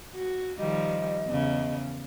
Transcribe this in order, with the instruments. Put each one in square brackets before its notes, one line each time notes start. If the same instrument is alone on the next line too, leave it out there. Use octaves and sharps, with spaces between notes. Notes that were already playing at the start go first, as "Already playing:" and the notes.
[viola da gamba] F#4
[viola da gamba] D#3 F3 G3 [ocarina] D#5
[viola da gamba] E2 C#3